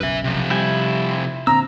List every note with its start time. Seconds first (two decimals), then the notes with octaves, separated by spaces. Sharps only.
0.01 F#1 B1 F#2 B4 E5
0.24 C3 F3
0.50 G3 E4 G5 G#5
1.47 A#2 D3 C4 A#5 E6